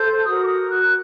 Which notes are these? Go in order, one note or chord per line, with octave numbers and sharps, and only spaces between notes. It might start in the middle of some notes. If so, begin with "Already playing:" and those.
Already playing: A4 C5 G6
F#4 A#4 D#6
D6
D#6
F#6